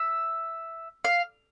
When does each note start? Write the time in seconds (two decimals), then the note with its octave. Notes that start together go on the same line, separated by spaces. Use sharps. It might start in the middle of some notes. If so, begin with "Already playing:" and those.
Already playing: E5
1.05 F5